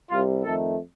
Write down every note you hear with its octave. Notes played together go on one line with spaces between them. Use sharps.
C2 C3 G3 F4
F2 D#3 A3 A4